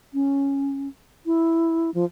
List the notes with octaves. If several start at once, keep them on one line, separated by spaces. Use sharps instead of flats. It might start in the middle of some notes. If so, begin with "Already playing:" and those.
C#4
E4
F3